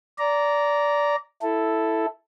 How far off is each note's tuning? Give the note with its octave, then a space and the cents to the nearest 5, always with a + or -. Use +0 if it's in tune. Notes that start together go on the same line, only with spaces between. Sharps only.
D5 -15 A#5 +0
E4 +0 A4 +0